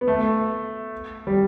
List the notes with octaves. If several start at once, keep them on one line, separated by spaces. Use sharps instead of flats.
B3
A3
G3